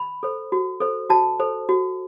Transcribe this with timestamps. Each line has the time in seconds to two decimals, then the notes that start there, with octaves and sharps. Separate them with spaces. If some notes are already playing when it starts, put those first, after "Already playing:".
Already playing: B5
0.23 A4 C5
0.52 F#4
0.80 A4 C5
1.10 F#4 A5
1.39 A4 C5
1.69 F#4